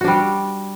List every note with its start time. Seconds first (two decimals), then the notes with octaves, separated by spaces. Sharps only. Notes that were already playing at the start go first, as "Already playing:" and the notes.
0.01 F#4
0.04 D4
0.08 G3